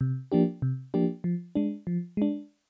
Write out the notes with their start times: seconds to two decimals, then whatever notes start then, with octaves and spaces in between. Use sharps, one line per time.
0.01 C3
0.32 F3 A#3 D4 G4
0.62 C3
0.94 F3 A#3 D4 G4
1.24 F3
1.55 G#3 D4
1.87 F3
2.17 G#3 D4